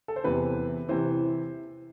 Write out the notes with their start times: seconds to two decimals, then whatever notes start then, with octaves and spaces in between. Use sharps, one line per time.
0.08 A4
0.16 C5
0.24 E2 C3 E3 B4
0.89 C3 E3 C5